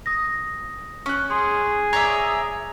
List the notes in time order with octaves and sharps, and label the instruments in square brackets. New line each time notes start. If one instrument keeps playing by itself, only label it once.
[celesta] D#6 A#6
[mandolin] C#4 [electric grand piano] C#6 F#6
[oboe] G#4 [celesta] C6
[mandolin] C#5 D5 E5 [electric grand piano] A#5 G#6 [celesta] F7